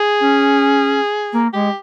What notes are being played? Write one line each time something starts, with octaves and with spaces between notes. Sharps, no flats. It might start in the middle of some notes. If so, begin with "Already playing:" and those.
Already playing: G#4
C#4
A#3
G#3 G4